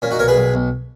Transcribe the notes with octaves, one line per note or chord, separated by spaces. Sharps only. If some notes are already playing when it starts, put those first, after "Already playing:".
A#2 C#4
D#4 F#4
B1 A#4 C#5
G#4 B4
B1
B1